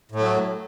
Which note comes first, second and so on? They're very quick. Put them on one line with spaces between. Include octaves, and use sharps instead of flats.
A2 A3 F#3